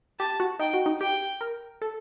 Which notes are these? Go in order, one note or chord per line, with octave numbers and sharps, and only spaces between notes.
G4 A5
F#4
D#4 G5
F#4
D#4
G4 G5
A#4
A4